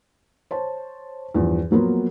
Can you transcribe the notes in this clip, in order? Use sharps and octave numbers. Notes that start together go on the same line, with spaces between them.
C5 C#5 A5
E2 G2 F3
F3 F#3 A#3 B3 F4